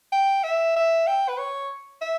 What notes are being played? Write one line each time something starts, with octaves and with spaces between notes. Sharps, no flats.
G5
E5
E5
G5
B4
C#5
E5